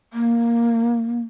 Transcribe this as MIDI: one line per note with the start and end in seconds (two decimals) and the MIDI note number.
0.13 1.21 58